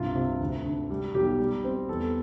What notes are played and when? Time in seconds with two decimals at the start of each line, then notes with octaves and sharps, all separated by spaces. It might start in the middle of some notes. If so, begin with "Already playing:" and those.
Already playing: C2 G2 F4
0.15 C3
0.40 D2
0.64 D3
0.90 G3
1.14 B1 G4
1.39 G3
1.64 C4
1.89 E2 A4